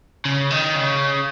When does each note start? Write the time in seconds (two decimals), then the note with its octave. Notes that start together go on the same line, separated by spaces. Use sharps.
0.25 C#3
0.50 D#3
0.75 C#3